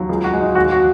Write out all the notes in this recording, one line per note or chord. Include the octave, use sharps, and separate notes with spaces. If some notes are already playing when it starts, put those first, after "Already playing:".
Already playing: D#2 F#3
C#2 G#4
F#4
G#3
D#4
D#2 F#4
F#4